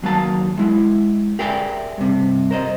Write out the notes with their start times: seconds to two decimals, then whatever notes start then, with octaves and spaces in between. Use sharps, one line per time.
0.02 D#2 F#3 A#3 A5
0.58 G#3 E4
1.39 G4 G#4 A#4 D5 E5 G5
1.98 G2 C3
2.51 A#4 C5 D#5